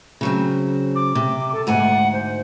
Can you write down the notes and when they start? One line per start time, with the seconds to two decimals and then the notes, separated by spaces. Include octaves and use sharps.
0.21 C#3 F#3 C4
0.95 D6
1.15 C3
1.52 A4
1.67 D2 G#2 F#5 G#5
2.13 C5